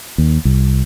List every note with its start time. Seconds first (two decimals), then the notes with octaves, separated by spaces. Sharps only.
0.18 D#2
0.45 C2